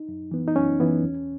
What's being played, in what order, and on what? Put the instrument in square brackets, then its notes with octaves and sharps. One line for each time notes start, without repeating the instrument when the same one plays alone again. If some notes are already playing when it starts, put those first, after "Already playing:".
Already playing: [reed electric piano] D#4
F#2
E3 B3
D#4
F#2 C#4
E3 B3
E2